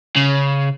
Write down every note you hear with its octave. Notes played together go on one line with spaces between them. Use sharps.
C#3